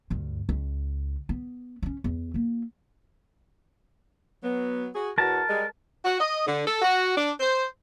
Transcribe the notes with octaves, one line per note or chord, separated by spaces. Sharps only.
D2 G2
C#2
B3
B3 C#4
E2
A#3 F4
F#3 B3
F#4 G#4
E2 F#4 A#4 A5
G3 G#3
F#4
D#5
D3
A4
F#4
D4
C5